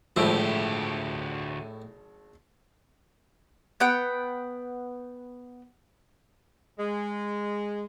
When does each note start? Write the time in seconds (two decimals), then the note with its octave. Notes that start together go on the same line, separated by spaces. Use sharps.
0.16 G#1 D2 A2 F3 E4 G4 E6
3.80 B3 F#5 G5
6.78 G#3